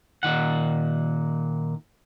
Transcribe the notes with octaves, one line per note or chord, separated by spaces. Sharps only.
A#2 D#3 F#5